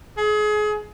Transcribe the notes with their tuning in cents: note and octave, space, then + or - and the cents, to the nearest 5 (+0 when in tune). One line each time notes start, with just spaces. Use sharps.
G#4 +30